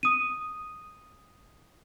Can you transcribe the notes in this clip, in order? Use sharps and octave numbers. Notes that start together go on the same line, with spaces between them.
D#6 D#7